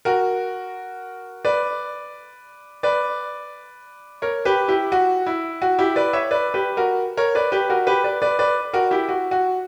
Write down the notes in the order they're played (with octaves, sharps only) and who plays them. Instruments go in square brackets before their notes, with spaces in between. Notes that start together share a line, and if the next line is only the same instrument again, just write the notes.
[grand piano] F#4 A#4
B4 D5
B4 D5
A#4 C#5
G4 B4
E4 G4
F#4
E4
F#4
E4 G4
B4 D5
C#5 E5
B4 D5
G4 B4
F#4 A#4
A#4 C#5
B4 D5
G4 B4
F#4 A#4
G4 B4
B4 D5
B4 D5
B4 D5
F#4 A#4
E4 G4
F#4
F#4